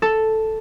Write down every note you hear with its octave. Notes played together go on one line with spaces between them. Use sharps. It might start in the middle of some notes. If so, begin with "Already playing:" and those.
A4